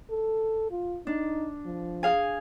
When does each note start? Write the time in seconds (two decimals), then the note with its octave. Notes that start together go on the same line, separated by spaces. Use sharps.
0.11 A4
0.71 F4
1.07 D4 D#4
1.65 F3
2.03 G#4 F5 G#5